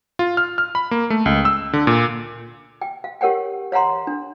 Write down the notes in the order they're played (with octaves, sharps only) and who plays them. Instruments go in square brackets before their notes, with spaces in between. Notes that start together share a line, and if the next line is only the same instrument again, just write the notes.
[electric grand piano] F4
F6
F6
B5
A#3
A3
C#2
E6
D3
A#2
[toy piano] G5
F5
G4 A#4 C#5 F#5 G5
C#5 F5 F#5 A#5 C6
D4